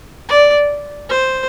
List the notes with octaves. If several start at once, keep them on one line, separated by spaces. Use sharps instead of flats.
D5
C5